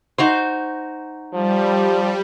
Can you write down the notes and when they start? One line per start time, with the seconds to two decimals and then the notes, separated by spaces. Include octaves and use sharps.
0.18 D#4 F#4 C5
1.34 F3 G3